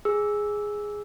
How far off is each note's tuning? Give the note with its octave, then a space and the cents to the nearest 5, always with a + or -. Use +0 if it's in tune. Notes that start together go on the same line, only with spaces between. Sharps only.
G#4 +0 E6 -5